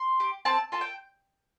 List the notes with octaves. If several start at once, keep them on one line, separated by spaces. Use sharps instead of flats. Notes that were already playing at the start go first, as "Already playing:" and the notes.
Already playing: C6
G4
C4 A5
F4 A4 A5
G5